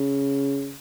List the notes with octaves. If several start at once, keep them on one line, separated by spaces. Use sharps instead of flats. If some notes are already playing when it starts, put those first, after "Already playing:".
Already playing: C#3